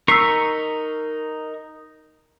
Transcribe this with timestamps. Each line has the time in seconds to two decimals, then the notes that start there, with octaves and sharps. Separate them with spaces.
0.08 D#4 A#4 C#6 E6 B6 C7